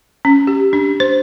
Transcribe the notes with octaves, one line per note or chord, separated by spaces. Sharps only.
C#4
G4
D4
C5